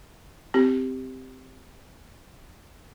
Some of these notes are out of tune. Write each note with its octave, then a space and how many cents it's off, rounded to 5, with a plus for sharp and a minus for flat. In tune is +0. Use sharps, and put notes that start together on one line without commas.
C4 -15 G4 +0